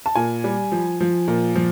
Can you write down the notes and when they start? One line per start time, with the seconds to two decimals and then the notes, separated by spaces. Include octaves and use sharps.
0.06 A5
0.16 A#2 G#5
0.44 G3
0.72 F3
1.01 F3
1.28 A#2
1.55 F3